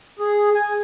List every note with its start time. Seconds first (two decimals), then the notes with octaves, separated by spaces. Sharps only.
0.19 G#4
0.55 G#5